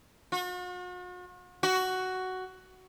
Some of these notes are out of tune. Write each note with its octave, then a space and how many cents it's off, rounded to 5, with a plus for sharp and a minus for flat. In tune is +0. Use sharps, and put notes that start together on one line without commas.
F#4 -45
F#4 +10